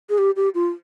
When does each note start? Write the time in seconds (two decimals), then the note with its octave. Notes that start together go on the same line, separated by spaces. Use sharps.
0.10 G#4
0.18 G4
0.36 G4
0.55 F4